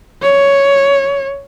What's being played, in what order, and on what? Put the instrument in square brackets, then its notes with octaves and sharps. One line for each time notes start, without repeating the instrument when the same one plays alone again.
[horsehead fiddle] C#5